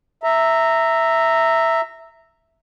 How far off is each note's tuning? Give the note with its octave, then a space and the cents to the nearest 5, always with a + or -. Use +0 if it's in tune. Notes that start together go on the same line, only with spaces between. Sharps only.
E5 +0 A#5 -15